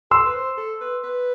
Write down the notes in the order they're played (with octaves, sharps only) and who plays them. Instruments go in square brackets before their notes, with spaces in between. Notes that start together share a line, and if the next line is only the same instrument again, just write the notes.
[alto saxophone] A4 [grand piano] C6 E6
[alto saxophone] B4
C5
A4
B4
B4